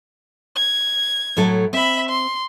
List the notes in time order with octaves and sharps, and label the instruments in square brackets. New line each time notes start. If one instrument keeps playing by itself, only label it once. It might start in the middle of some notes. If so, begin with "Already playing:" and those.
[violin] G#6
[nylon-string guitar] A2 F#3 A4
[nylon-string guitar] C4 [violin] E5 B5
[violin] C6